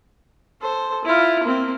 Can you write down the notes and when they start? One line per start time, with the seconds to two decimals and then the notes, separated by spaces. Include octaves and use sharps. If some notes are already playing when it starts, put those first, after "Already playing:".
0.62 A4 C5
1.04 E4 F4
1.43 A#3 C4